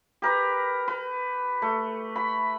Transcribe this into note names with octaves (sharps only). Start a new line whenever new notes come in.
G4 A#4 B4
B4
A3
B5